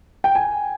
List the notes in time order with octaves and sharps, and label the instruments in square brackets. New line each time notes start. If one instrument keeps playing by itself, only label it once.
[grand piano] G5
G#5